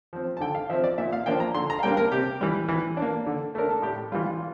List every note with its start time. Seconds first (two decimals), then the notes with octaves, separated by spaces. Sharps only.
0.13 F3 C4
0.37 A5
0.40 D3 G5
0.55 F5
0.70 F3 C4 E5
0.84 D5
0.98 A#2 E5
1.13 F5
1.26 F3 A#3 D4 G5
1.40 A#5
1.54 D3 C6
1.70 A#5
1.79 F5
1.83 G3 A#3 D4 G5
1.97 A#4
2.11 C3 G4
2.41 E3 G3
2.69 E3
2.97 D4
3.02 A#3
3.27 D3
3.55 A3 D4 A#4
3.71 A4
3.82 A2 G4
4.12 E3 G3 F4
4.30 F4